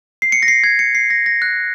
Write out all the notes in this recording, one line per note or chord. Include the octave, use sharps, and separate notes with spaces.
C7
C#7
A#6
C7
G#6
C#7
C7
A#6
A#6
F#6